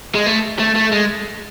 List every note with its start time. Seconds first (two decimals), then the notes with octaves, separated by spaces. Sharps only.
0.15 G#3
0.26 A3
0.59 A3
0.76 A3
0.93 G#3